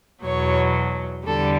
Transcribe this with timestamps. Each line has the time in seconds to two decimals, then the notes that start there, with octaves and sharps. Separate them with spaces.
0.24 E2 B2 F#3 C#5
1.26 E2 D3 G3 A4